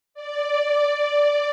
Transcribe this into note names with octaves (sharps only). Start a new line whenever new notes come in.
D5